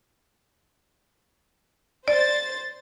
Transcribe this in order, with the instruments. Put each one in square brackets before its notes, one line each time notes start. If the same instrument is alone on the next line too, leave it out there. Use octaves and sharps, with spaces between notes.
[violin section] C5 A6 [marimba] D5